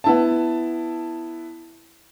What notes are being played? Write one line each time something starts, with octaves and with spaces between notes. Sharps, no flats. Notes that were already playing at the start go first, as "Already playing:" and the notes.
B3 E4 A5